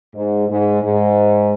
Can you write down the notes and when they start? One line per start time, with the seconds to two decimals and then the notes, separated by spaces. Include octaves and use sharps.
0.15 G#2
0.49 G#2
0.82 G#2